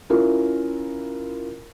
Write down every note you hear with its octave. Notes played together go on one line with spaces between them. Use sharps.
C#4 E4 F4 A#4